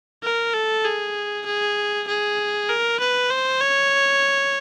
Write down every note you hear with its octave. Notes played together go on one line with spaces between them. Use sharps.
A#4
A4
G#4
G#4
G#4
A#4
B4
C5
C#5